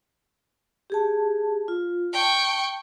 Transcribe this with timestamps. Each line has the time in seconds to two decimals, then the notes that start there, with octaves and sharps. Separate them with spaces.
0.90 G4 G#4 A5
1.68 F4
2.13 G5 A5 C#6